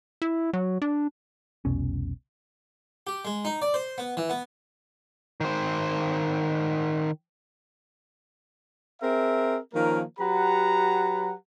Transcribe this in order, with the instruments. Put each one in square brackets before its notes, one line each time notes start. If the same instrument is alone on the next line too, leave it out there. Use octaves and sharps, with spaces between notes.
[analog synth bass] E4
F#3
D4
[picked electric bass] F1 C2 B2 C#4
[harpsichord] G4
G#3
D#4
D5
C5
B3
E3
B3
[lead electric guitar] D#3 C5
[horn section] C4 G#4 A#4 E5
D#3 F3 A#3 C#4 A#4
F#3 G4 B4 F#5 A#5